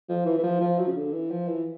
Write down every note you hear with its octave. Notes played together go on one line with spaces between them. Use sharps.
F3
E3
E3
F3
F3
F#3
C#3
D3
E3
F3
E3